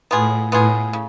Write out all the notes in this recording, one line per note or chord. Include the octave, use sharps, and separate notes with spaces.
A2 B3 F4 G#4
A2 B3 F4 G#4
C#3